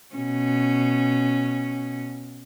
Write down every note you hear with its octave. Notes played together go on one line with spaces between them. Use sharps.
B2 C#4